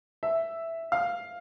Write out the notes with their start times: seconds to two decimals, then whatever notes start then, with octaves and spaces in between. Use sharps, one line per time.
0.23 E5
0.92 F5